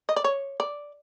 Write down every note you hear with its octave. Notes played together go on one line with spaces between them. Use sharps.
D#5
D5
C#5
D5